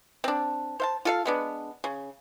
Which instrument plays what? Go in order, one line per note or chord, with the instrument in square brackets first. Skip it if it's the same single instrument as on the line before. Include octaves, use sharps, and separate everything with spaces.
[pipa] C4 D4
C5 F5 A5
F4 A4 F5
G#3 B3 D4
C#3